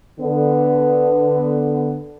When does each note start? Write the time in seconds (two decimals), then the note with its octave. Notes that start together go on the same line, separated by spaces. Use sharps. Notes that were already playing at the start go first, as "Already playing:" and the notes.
0.19 D3 B3